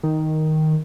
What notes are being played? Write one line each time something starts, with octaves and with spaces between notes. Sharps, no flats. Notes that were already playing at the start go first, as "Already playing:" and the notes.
D#3